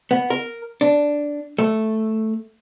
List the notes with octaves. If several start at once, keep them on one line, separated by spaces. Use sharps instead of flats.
B3
A#4
D4
A3